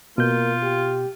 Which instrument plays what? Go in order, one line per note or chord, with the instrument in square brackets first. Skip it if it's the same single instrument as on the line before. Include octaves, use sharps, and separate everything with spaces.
[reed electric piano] B2 G6 [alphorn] A#3 [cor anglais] F4
[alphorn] G4